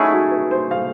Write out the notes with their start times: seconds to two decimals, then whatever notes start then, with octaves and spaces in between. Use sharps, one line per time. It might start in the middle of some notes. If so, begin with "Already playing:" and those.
Already playing: F#3 A3 C#4 D#4 E4 G#4
0.12 F#4
0.31 B4
0.51 C5
0.71 F5